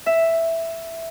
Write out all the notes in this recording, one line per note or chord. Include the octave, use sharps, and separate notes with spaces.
E5